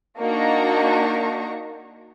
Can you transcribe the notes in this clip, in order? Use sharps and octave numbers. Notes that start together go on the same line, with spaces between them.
A#3 D4 D#4 F#4 A#5 C#6